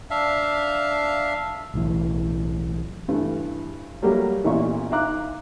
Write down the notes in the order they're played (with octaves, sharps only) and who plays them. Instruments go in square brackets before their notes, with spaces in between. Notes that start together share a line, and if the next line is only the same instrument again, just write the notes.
[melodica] D4 E5 F5
[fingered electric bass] B1 A2 E3
[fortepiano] G2 E3 A3
F#3 G3 A3 A#3 F#4 G4
A1 E2 A#2 E4 E5 C#6
D#4 E5 F5 A#5 D6 F#6